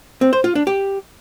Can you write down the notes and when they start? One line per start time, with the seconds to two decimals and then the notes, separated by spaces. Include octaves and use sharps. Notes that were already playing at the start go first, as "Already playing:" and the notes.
0.21 C4
0.33 C5
0.44 F4
0.55 D4
0.67 G4